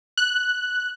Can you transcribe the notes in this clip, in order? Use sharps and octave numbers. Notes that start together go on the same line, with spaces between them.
F#6